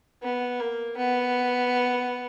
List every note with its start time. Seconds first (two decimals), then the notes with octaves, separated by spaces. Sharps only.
0.23 B3
0.59 A#3
0.98 B3